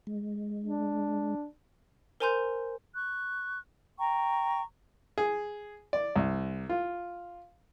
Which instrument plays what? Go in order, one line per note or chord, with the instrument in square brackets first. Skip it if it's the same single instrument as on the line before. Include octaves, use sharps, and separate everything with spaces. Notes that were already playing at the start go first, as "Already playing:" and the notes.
[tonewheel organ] G#3
[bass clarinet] D4
[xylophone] A#4 C5 G#5 A#5 C6 G6
[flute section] C#6 F#6
G5 A#5 C#6
[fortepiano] G#4
D5
C2
F4